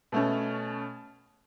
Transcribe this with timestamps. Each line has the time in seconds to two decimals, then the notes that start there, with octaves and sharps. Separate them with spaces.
0.12 B2 A3 C#4